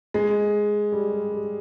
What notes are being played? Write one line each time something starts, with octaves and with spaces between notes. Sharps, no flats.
G#3
G3
G3
G3